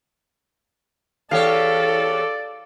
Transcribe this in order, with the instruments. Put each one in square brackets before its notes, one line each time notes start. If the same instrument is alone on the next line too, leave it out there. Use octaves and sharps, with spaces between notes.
[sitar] E2 G4 C#5 [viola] A4 [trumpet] D5 [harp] F5